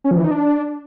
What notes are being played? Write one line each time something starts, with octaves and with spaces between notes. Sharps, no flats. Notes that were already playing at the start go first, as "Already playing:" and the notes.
C#4
F3
E3
D#4
D4